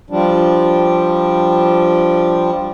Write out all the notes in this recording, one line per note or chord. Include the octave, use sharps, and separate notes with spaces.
F3 G3 D4